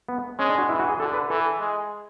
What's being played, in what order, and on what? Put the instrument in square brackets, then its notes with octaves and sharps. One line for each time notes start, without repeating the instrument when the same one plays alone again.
[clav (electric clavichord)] B3
[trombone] G#3 [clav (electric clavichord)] C#4
[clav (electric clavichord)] D4
F#4
[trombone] E3 [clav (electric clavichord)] E4
[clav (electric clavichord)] F#4
G#4
[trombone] D3 [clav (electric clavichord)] A4
[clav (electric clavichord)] B4
[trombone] E3 [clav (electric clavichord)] A4
[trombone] G#3